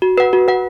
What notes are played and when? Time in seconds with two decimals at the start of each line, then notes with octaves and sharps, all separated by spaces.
0.02 F#4
0.18 B4 F#5
0.33 F#4
0.48 B4 F#5